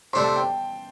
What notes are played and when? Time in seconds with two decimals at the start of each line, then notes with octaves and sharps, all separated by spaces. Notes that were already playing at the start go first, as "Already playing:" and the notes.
0.13 C3 A3 D4 C5 C6
0.24 A5
0.36 G5